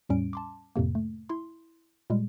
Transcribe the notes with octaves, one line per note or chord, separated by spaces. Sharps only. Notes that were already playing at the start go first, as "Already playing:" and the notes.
E2 A2 G3 C#4 D7
A5 C6 D6
F2 A2 C3 A#3
A3
E4 C6
A#2 G3 G#3